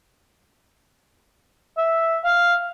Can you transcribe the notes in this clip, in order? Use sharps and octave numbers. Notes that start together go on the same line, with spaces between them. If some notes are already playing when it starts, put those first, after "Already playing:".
E5
F5